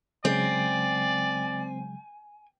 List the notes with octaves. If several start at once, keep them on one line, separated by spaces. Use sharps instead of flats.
C#3 F#3 G#3 C4 D5 G#5